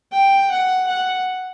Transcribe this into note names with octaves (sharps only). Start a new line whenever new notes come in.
G5
F#5
F#5